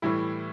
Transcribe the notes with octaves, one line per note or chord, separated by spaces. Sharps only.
A2 E3 G3 E4